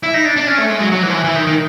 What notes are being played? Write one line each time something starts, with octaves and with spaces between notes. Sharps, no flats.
E4
D#4
D4
D4
C#4
A3
G#3
F#3
F#3
E3
F3
E3
E3
D#3
D#3